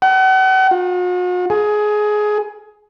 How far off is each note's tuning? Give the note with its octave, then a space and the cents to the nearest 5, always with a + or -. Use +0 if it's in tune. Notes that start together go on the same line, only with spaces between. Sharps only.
F#5 +40
F#4 -45
G#4 +20